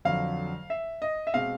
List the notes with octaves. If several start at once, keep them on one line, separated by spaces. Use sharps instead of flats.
F2 D3 F#3 F5
E5
D#5
E5
B2 G#3 C4 F5